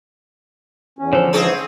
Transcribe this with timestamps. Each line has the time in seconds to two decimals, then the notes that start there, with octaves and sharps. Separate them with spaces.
0.99 E2 C#4
1.13 D3 F3 A4 C5 C#5
1.33 G#2 E3 C4 C#4 G#4